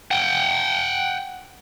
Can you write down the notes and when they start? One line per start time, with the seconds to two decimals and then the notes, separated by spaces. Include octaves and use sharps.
0.11 F#5 G5